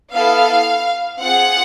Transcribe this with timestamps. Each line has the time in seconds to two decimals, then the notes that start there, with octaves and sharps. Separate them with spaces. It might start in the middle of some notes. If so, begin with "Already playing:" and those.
0.12 B3 E4 A4 F5
1.21 C4 F4 G#4 F#5